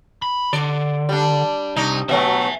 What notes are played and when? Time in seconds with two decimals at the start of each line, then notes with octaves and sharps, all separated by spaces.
0.22 B5
0.53 D3 D5
1.09 G3 D4
1.76 C2 D#4
2.09 B2 F#3 A3 E5 G#5